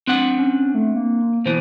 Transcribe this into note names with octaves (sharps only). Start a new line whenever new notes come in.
C4 D4 F#5 F#6
C#4
A3
A#3
B2 E3 C5